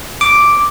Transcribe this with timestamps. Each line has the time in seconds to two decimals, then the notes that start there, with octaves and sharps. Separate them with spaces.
0.21 D6